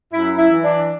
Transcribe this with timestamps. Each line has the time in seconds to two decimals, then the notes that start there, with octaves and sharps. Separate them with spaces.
0.13 F#2 E4
0.38 E4
0.51 E3
0.63 D4